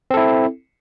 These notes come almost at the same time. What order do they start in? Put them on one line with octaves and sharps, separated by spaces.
C4 A4 E4